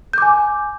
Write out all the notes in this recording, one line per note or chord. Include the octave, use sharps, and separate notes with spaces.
G#5 D6 G6